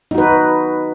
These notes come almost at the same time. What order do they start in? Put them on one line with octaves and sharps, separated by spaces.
D#4 F#4 B4